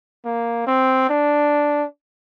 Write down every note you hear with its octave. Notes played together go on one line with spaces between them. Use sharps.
A#3
C4
D4